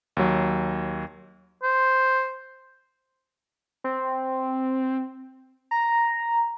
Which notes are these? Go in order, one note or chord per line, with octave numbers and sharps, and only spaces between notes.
D#2 F#3
C5
C4
A#5